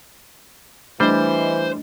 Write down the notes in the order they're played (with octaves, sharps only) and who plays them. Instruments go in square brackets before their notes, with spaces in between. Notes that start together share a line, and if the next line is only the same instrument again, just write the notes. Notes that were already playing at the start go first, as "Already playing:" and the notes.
[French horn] E3 [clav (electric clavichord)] G3 [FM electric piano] A3 D4 D#5 [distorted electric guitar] C5